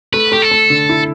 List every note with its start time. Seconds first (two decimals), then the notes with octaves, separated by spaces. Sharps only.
0.13 A3 B4
0.32 A3 G4
0.42 A4
0.51 A3
0.70 D3
0.89 E4